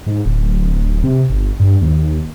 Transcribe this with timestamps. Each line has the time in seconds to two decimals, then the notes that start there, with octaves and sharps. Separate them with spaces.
0.07 G#2
0.25 D1
1.04 C3
1.30 G1
1.60 G2
1.82 D#2